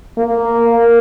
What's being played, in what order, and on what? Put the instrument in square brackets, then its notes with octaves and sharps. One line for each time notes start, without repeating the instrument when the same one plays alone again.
[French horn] A#3